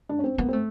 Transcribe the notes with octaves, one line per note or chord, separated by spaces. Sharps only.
D4
C#4
C4
A#3 B3
C4
A3